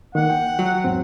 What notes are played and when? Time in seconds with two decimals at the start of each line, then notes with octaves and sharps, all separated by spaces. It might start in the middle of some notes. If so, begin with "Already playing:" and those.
0.15 D#3 A#3 F#5
0.30 G5
0.59 F#3
0.84 E2 G#2 C4